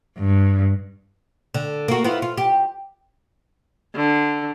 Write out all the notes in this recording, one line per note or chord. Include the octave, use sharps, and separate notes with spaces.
G2
D3
A#3 F#4
B3 E4 F4
F4
G4
D3